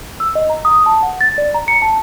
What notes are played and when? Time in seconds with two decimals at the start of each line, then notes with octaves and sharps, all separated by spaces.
0.20 E6
0.35 D#5
0.50 A#5
0.65 D#6
0.86 A5
1.03 F#5
1.21 A6
1.38 D5
1.54 A#5
1.68 C#7
1.82 A5